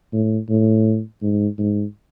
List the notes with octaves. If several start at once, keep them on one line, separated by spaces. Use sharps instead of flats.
A2
A2
G#2
G#2